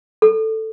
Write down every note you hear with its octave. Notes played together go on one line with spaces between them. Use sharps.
A4